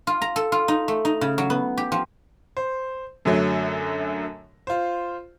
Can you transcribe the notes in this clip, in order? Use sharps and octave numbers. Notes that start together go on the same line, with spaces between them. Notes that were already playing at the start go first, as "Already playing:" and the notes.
F4
A#5
A4
F4
D#4
A3
D#4
C#3
F#3
B3
G4
F3
C5
F#2 D3 F#3 A3
F4 C5